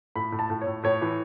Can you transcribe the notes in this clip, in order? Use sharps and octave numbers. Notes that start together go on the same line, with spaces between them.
A2 B5
A2
A5
A2
C#5
A2
A2 C#5
E3